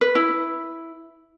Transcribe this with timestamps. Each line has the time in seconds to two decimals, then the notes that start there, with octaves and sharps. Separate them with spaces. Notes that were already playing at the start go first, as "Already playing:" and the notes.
0.01 B4
0.15 E4